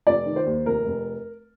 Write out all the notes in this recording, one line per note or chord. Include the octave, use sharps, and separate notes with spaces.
F1 D5
D#3
C5
D#2
F1 A#4
F1